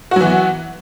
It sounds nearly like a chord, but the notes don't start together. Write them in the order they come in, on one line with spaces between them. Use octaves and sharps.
F#4 F#3 E3 B3